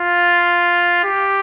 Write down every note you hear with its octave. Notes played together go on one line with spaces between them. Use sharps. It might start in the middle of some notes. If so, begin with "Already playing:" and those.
Already playing: F4
G4